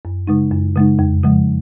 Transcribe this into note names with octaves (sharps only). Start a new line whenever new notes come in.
F#2
C#3 G#3 D#4
F#2
C#3 G#3 D#4
F2
C#3 F3 G#3